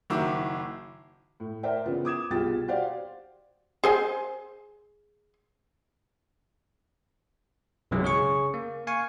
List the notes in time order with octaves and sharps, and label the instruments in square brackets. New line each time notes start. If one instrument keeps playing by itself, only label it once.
[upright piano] F#1 D#3 E4 F#4 D6
[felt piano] A2
A#4 C5 D5 E5 G5
C#3 E3 B3 F4
D6 D#6 G#6 E7
C2 B2 F4 G4 G#4 A6
F#4 G4 C5 D5 F5
[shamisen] G#4 C5 G#5
[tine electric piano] B1 F#2 C3 E3 F#3 G#3
C#3 G#4 C#5 C#6
A#3
F5 G#5 C#6